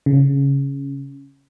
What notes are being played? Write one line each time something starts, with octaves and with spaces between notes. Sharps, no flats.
C#3